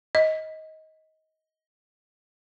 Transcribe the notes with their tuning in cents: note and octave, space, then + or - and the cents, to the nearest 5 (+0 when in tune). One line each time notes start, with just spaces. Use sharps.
D#5 +20